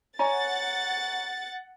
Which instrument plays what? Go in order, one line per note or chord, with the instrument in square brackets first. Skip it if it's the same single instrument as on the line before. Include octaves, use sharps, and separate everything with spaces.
[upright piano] C#5 G#5 A#5 [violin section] F#5 A6